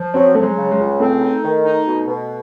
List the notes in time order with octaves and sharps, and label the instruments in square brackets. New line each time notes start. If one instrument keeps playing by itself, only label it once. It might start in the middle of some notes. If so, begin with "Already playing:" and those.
Already playing: [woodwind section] F3
[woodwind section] F#3 [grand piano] C4
[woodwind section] F#3 [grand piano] A3
[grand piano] G#3
[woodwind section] C#3
[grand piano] G#3
[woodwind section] C#2
[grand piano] A3 [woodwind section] C4
[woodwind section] D#4
D#3
D#4
B2
B2